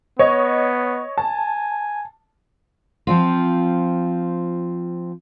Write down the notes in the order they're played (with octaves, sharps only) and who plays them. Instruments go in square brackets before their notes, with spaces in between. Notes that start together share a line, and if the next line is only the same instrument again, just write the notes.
[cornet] B3 [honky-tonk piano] C#5 D#5
[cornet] G#5 [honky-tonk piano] A5
[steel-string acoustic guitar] F3 C4 F4